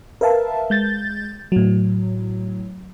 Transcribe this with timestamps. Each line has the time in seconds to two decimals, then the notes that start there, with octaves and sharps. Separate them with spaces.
0.21 A#4 B4 E5 F5 A5
0.70 G#3 G6 A6
1.52 A2 F#3